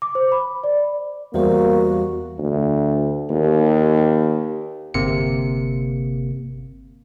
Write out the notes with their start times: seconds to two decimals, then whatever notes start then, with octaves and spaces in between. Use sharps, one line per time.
0.02 D6
0.15 C5
0.32 B5
0.64 D5
1.34 E2 G3 A#3 F#4 C5
2.38 D2
3.30 D#2
4.94 G1 C3 A#3 C#7